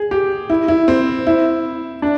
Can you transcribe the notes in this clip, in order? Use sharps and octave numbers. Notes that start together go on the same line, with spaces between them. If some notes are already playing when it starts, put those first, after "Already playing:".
Already playing: G#4
G4
E4
E4
C4
E4
D4